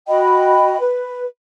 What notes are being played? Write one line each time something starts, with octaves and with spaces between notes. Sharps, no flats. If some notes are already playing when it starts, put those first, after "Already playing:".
F#4 D#5 G5 B5
B4